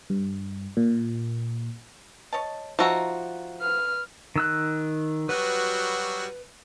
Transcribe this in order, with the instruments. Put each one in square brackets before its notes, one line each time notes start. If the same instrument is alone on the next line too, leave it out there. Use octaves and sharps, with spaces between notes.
[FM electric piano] G2
A#2
[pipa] C#5 D#5 A5
[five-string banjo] F3 F#4 [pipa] D#4 E5 A#5
[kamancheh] B4 F6
[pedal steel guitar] D#3 E6 F#6
[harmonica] F#3 G3 F#4 [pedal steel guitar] B4